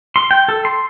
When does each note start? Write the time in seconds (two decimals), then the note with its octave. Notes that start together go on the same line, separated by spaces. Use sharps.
0.16 C6
0.31 G5
0.48 A4
0.65 C6